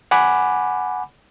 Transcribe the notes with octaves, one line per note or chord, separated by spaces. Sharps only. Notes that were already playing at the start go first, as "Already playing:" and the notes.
F#5 G#5 B5 D6